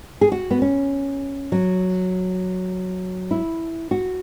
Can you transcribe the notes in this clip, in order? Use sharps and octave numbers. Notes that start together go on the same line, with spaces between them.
G#4
F#4
B3
C#4
F#3
E4
F#4